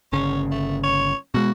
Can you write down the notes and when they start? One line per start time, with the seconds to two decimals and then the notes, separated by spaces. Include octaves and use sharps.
0.13 G1 C#3 C#4
0.51 A3
0.84 C#5
1.34 B2 G#3 F#4